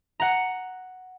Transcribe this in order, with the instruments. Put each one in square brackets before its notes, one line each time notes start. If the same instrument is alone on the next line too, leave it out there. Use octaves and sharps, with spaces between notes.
[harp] F#5 A#5